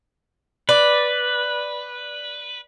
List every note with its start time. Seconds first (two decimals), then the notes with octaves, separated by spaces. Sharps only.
0.69 B4 D5